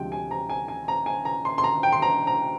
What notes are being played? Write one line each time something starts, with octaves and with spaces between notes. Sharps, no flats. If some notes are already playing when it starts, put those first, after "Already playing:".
Already playing: D2 C3 F3 G#3 G5
G#5
A#5
G#5
G#5
A#5
G#5
A#5
C6
C6
A#5
G5
C6
A#5
A#5